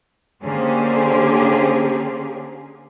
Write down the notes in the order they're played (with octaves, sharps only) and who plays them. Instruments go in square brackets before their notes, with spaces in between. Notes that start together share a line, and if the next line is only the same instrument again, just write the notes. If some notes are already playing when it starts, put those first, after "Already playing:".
[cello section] D3 A#3 C#4 G4 G#4 C5